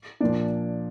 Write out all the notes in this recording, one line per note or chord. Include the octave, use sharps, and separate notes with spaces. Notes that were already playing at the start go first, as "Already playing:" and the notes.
A#2 F3 A#3 D4 D5